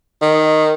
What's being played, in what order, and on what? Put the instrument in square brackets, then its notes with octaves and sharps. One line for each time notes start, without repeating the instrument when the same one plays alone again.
[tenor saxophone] D#3